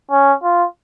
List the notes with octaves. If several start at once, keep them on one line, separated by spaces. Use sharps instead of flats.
C#4
F4